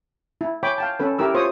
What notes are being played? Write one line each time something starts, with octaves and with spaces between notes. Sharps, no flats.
E4
C#5 G5 G#5 B5 D6
F5 G5 A5
C#4 A4 B4
E4 G4 A#4 E6
F4 C5 C#5 D#6